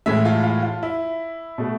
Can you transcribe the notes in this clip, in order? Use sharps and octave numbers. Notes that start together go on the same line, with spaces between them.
A2 E3 G#3 E5
F4
F4
F4
E4
B2 A3